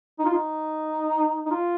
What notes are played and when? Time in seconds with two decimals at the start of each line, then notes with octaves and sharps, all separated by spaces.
0.19 D#4
0.25 F4
0.33 D#4
1.46 D#4
1.51 F4